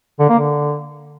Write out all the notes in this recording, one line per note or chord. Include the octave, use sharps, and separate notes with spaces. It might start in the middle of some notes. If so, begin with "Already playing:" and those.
D3
A#3
D3